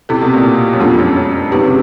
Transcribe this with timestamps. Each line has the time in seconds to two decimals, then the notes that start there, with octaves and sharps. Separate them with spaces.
0.09 C3 C4 E4 A4
0.21 B2
0.34 A#2
0.73 F#2
0.80 F2 G#3 B3 D4 F4 A4
0.99 F#2
1.16 F#2
1.52 C3 G#3 C4 D#4 G4 B4
1.64 C#3